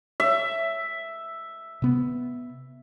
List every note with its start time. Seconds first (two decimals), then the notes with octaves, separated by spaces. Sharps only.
0.20 E5
1.82 C3 B3